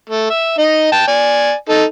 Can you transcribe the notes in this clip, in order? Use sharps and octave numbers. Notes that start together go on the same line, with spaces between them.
A3
E5
D#4 D#5
G5 A5
D5 G#5
D#4 A4